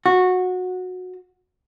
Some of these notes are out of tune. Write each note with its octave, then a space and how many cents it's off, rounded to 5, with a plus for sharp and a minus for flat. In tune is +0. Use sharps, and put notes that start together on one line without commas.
F#4 -15